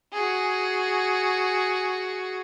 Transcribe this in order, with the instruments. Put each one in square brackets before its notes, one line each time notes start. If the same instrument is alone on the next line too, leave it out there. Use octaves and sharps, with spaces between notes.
[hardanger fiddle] F#4 G#4